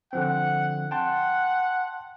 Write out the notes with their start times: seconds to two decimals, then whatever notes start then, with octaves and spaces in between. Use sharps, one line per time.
0.13 D3 F3 C4 F#5
0.91 F#5 G5 A5 C6